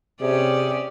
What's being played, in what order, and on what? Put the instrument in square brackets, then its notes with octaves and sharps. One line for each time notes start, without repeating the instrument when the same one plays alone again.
[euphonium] C3 [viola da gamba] C#4 G4 D5 [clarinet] G#4